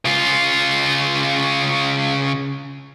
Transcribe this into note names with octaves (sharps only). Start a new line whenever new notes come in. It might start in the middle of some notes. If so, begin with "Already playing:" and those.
C#3 F4